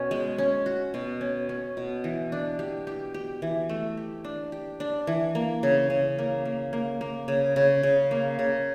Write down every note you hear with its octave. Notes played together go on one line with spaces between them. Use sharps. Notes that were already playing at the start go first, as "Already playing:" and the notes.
Already playing: B2 C#4
G#3
C#4
F#4
B2
C#4
C#4
B2
E3
D4
G4
G4
G4
E3
A3
G4
D4
G4
D4
E3
A#3
C#3
C#3
A#3
A#3
A#3
A#3
C#3
C#3
C#3
A#3
C#3